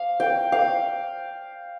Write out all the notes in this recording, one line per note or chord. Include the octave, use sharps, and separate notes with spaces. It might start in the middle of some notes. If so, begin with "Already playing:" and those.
Already playing: F5
G5
F5